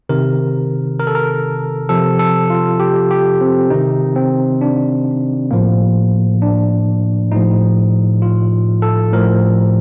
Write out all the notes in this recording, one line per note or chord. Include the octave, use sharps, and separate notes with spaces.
C3 D#3 A#4
A#4
A4
A#4
C3 F3 A4
A4
F4
G4
G4
C4
C3 D#3 D#4
C4
D4
A2 F3 A#3
D4
A2 F3 D#4
F4
A4
A2 F3 A#4